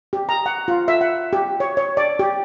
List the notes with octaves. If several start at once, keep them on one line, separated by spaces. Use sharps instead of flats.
G4
A#5
F#5
F4
E5
F#5
G4
C#5
C#5
D5
G4